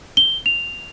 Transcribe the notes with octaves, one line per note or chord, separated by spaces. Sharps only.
G7
F7